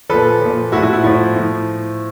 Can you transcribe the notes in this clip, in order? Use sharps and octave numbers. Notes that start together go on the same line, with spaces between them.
A#2 F3 A4 B4
A#2 F3
A2 F3 E4 F#4
E4 F#4
E4
A2 F3 E4
A2 F3